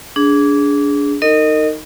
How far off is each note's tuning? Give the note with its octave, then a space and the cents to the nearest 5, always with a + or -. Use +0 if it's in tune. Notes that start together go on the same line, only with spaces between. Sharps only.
D4 -25 G#4 +0
D#4 +0 A#4 -35 D#5 -15